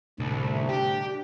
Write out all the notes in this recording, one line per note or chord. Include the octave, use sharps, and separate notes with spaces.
C2 A2 D3
D4 G4